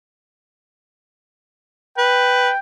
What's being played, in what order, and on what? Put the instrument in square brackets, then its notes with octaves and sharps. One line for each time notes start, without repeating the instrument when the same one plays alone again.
[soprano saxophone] B4 [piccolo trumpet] G5